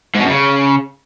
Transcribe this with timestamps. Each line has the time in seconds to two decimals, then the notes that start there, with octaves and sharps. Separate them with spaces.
0.15 G#2
0.20 B2
0.25 F#2
0.30 C#3